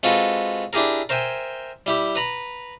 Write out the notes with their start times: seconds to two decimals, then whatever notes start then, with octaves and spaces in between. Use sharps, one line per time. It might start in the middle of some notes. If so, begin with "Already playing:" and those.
0.03 G#3 C4 F4 F#4 A4 B4
0.73 D4 E4 G4 G#4 A#4
1.09 A#4 C5 E5 G5 G#5
1.86 G3 E4 G4
2.15 B4 A#5 B5